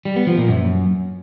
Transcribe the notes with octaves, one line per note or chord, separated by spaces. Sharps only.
G3
B3
F3
A#2
F#2